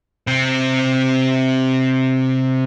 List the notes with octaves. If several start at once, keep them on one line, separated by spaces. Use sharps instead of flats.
C3 C4